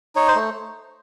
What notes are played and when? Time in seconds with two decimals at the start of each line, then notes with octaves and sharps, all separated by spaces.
0.16 D#4 C#5
0.28 C5
0.35 A3